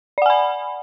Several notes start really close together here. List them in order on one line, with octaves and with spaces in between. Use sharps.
D5 F#5 G#5 B5